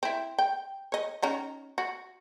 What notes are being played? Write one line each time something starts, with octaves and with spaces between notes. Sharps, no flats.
C4 E4
G5
C#5 D#5
C#4 D#4 F#4
F#4